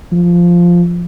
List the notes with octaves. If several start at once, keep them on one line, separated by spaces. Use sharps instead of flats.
F3